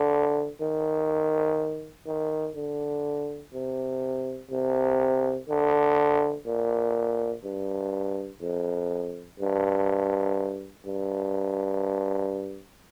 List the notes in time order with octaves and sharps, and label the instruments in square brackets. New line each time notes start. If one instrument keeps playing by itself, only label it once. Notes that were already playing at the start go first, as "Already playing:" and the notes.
Already playing: [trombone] D3
D#3
D#3
D3
C3
C3
D3
A#2
G2
F2
G2
G2